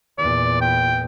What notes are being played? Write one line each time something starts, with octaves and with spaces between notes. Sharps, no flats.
E2 A#2 D5
G5